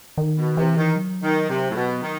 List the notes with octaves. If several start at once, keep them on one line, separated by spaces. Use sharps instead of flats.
D#3
B2
C3 E3
D#3
F#3
D#3
C3
A2
B2
D#3